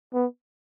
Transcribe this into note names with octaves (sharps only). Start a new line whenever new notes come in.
B3